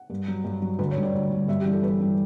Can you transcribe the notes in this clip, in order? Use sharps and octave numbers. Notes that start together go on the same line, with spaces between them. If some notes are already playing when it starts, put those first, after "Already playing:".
Already playing: F#5
G2
F#3
G2
F#3
D2 B4
C#5
D3 G3
D5
D2
D3 G3
G2 E5
G4
E3 G3
A4
G2 B4
E3 G3